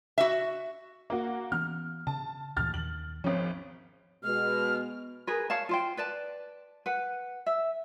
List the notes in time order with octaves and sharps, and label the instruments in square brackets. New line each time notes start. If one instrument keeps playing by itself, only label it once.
[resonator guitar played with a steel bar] F#4 E5
[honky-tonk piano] A#3 F#4
[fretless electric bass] E3 B3 C#4 [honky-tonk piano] F6
[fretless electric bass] C#3 [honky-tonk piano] A5
[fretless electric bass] D2 A#2 E3 [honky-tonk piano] F6 A6
[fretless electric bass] D#2 D#3 [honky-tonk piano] F#7
[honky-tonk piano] G#1 C#4 [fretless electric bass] F3
[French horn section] B2 G#3 [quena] F6
[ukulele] G#4 A#4 B4
C#5 F5 A5
F4 C5 G5
B4 D5 A5
B4 F#5
E5